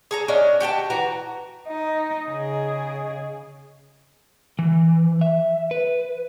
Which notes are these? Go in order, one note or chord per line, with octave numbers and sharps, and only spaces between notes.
G#4 A4 A#5
C#4 D4 D#5 F5
F#4 G4 G5 A5
E3 F#4 A#5
D#4 D#5
C#3 G#4
E3
E5
B4